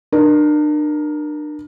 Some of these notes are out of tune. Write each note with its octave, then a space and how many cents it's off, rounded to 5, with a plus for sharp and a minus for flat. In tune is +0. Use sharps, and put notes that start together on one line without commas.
D4 +40 A#4 +15